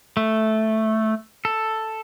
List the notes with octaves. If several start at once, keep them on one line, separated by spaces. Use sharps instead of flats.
A3
A4